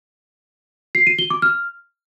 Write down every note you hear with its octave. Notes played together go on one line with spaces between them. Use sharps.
C7
D#7
G7
D6
F6